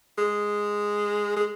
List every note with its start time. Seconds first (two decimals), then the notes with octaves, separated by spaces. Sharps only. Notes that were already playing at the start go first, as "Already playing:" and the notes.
0.18 G#3
1.37 G#3